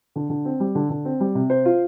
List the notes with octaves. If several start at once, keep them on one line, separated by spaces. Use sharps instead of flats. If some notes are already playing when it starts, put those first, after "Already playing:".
D3
D3
C4
G3
D3
D3
C4
G3
C3
C5
F4